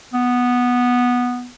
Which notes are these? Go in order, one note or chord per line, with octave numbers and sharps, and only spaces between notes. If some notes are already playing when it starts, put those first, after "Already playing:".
B3